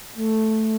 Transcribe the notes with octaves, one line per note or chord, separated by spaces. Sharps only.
A3